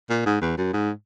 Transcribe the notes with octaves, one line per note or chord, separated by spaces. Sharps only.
A#2
G#2
E2
F#2
G#2